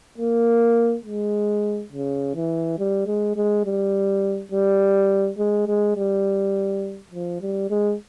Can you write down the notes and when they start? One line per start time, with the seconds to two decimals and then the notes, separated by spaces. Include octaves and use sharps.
0.18 A#3
1.05 G#3
1.92 C#3
2.35 E3
2.78 G3
3.06 G#3
3.36 G#3
3.65 G3
4.52 G3
5.38 G#3
5.67 G#3
5.96 G3
7.11 F3
7.41 G3
7.70 G#3